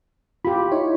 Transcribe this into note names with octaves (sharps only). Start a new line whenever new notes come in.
F4 G4 B5
D#4 E4 C#5